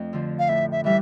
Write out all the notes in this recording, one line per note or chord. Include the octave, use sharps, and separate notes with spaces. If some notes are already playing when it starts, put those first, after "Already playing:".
Already playing: F2 A3 D4
D3 F3
F5
A2 E5
E5
E3 G3 E5